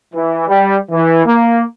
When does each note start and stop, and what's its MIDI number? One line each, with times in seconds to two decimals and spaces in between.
0.14 0.46 52
0.47 0.76 55
0.91 1.26 52
1.26 1.61 58